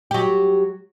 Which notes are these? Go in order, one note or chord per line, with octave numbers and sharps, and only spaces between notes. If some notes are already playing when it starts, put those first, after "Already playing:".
F#3 G4